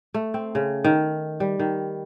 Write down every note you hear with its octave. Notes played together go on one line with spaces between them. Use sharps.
A3
C4
C#3
D#3
G3
D#3